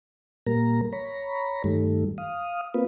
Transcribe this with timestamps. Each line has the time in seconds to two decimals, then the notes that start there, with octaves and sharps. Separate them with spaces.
0.47 A#2 G3 A#3 A#4 A#5
0.93 C#5 A#5 B5
1.64 G2 D#3 G3 A3
2.18 F5 D#6
2.74 A#3 C4 F4 B4